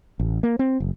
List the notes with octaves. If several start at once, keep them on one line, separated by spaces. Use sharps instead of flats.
A1
A#3
C4
F#1